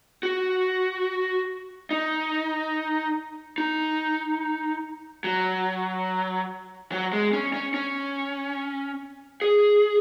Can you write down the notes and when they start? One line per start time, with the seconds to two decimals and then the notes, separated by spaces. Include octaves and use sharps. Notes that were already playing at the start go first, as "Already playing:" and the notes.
0.23 F#4
1.91 D#4
3.58 D#4
5.24 F#3
6.92 F#3
7.13 G#3
7.33 C#4
7.54 C#4
7.74 C#4
9.42 G#4